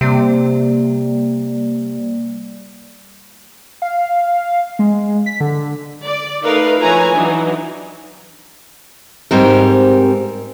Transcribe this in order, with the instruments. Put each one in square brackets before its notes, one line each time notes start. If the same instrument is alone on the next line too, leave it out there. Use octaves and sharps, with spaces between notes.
[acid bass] C3 [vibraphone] G3 A#3 D5
[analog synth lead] F5
G#3
B6
D3
[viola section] D5
A3 D#4 A#4 B4 F5
F3 E4 B4 C#5 G#5 A#5
E3 F#3 D4 D#4
[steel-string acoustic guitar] G#2 G3 C4 A#4